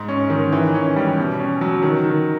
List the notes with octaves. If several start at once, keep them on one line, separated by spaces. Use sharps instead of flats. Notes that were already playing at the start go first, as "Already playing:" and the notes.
Already playing: G#2
C#4
D#3
E3
C#4
G3
B2
C#4
F#3
D#3
D#3